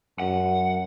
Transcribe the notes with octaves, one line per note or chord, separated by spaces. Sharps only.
F#2 F#5